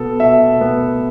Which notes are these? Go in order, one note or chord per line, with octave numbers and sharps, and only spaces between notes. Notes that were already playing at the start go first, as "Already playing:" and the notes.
Already playing: B2 B3 A4
B2 E5
B3